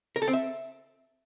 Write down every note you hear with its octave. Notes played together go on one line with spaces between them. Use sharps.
A#4
A4
C4
E5